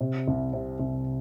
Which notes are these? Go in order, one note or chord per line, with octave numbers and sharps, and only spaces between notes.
C3
C2
C3
C2